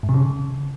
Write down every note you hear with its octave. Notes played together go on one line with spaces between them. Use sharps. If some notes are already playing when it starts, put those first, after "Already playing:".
G#2
C3
C#3